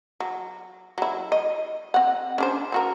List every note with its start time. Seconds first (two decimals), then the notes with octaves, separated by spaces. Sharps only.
0.20 F#3
0.98 F#3 E4
1.32 D#5
1.94 C4 F#5
2.38 C#4 D4 C5
2.72 C4 F#4 A#4